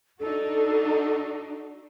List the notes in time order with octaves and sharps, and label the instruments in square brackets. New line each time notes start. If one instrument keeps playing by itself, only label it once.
[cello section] D4 D#4 F#4 [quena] A4